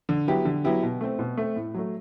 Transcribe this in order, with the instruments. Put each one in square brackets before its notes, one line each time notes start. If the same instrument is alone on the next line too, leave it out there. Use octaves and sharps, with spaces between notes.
[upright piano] D3
F#3 B3 E4 G4
D3
F#3 B3 E4 G4
B2
A3 C4
B2
A3 C4
A2
F#3 A3